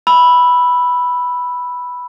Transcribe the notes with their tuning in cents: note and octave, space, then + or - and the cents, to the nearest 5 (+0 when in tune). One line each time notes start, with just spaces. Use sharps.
B5 -5 E6 +0